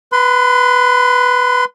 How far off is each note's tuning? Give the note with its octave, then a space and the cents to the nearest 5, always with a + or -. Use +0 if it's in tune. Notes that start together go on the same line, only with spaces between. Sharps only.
B4 +0 C6 -35